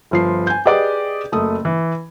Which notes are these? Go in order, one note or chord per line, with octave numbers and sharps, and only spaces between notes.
G1 F3 C7
G#5 G6
G4 G#4 B4 D5 D#5 D6
F#1 A3 D#6
E3